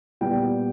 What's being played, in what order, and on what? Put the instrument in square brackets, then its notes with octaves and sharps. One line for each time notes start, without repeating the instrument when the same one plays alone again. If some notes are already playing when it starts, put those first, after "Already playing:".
[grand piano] A#2 G3 B3 G5